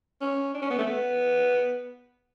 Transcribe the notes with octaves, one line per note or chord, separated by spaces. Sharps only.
C#4
D4
C#4
B3
A3
B3